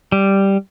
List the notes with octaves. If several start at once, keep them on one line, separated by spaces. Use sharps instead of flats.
G3